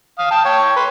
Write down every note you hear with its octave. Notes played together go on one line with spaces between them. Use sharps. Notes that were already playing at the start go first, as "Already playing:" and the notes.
F5 D#6
G5 A5
C#5 G5
B4 C6